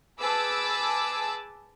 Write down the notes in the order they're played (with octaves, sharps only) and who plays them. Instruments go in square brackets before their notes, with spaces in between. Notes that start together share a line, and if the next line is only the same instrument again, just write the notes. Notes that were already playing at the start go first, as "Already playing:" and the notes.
[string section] G#4 B4 A5 D6 E6